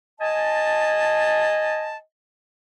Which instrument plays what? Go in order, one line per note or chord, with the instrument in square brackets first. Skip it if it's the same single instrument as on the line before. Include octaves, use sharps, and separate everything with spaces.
[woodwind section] D#5 G#5 A5